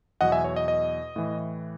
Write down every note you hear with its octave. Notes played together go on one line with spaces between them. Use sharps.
E2 B2 F#3 D#5 F#5
E5 G#5
C#5
D#5
D#5
A2 E3